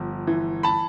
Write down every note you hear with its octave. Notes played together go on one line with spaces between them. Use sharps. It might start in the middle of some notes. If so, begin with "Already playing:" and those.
Already playing: G1 F3
E3
A5 B5